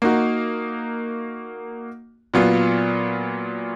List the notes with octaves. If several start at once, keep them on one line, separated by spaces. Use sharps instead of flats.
A#3 D#4 F#4
A#2 F#3 B3 F4